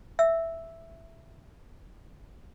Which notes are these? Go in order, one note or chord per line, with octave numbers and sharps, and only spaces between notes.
E5 E6